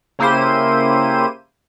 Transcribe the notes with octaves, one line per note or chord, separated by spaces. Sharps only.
C#3 A#3 E4 G4 C5 D#7